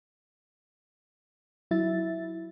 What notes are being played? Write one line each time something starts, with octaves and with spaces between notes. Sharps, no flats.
F#3 E4 E5 A6